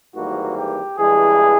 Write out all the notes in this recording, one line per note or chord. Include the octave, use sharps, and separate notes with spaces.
G#1 G#2 E3 G3 A#3 F#4
G4
A1 G2 E3 G#3 G#4